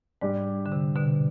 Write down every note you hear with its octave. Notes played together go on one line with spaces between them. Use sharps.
G#2 G3 D4 G4
D3
C3
B2 D3